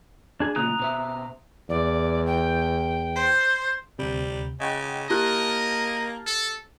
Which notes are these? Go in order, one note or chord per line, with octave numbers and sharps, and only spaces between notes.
D4 G#4
D2 A#2 C#3 A#5 D#6 F#6
B2 C5 E5
E2 D5
G5
C5
D2 C3 G3
C#3 D#5 F#5 G5
A#3 E4 G4 D#5 A5 F6 F#6 A6
A4